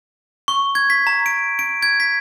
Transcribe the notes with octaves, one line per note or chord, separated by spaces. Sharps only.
C#6
G#6
B6
A#5
D7
D7
G#6
B6